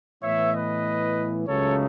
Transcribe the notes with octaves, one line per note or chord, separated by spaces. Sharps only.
A2 E3 B3 C#5 E5
B4 D#5
C#2 C#3 F#3 A3 D#4 A4 C#5